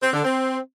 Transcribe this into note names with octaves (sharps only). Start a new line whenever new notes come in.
C4
D3
C4